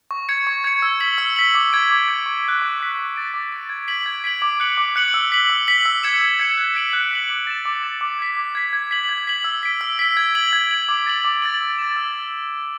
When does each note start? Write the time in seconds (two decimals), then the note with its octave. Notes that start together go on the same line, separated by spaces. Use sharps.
0.11 C#6
0.29 G#6 C#7
0.47 C#6
0.64 G#6 C#7
0.82 E6
1.00 B6 F#7
1.18 E6
1.36 B6 F#7
1.55 D6
1.72 G#6 D7
1.90 D6
2.08 G#6 D7
2.26 C#6
2.44 F#6 B6
2.62 C#6
2.80 F#6 B6
2.98 D6
3.16 A6 D7
3.34 D6
3.52 A6 D7
3.69 G#6
3.88 B6 D7 F#7
4.06 G#6
4.24 B6 D7 F#7
4.42 D6
4.60 F#6 C#7 F#7
4.78 D6
4.96 F#6 C#7 F#7
5.14 E6
5.32 B6 F#7
5.50 E6
5.68 B6 F#7
5.86 E6
6.03 G#6 C#7 E7
6.21 E6
6.40 G#6 C#7 E7
6.57 F#6
6.75 B6 D7 F#7
6.93 F#6
7.11 B6 D7 F#7
7.30 D6
7.47 A6 E7
7.65 D6
7.83 A6 E7
8.01 D6
8.19 G#6 B6
8.37 D6
8.55 G#6 B6
8.73 G#6
8.91 B6 F#7
9.09 G#6
9.27 B6 F#7
9.44 E6
9.63 B6 D7
9.81 E6
9.99 B6 D7
10.17 G#6
10.35 D7 F#7
10.53 G#6
10.71 D7 F#7
10.89 D6
11.06 A6 D7 F#7
11.25 D6
11.42 A6 D7 F#7
11.61 E6
11.79 A6 E7
11.96 E6